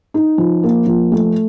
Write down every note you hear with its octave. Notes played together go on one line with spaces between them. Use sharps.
D#4
F3
A#3
F3
A3